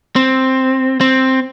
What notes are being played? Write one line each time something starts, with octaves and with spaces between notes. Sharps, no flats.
C4
C4